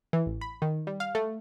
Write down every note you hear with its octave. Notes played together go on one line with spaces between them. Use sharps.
E3
A1
B5
D#3
G3
F5
A3